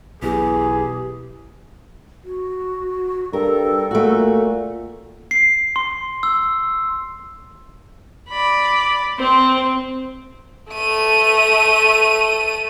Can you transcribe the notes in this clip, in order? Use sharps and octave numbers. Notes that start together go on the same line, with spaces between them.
B1 E2 G4 G#4
F#4
G2 A4 A#4
A#2 A3 F#4
C7
C6
E6
D5 B5
C4 C5
A3 D#7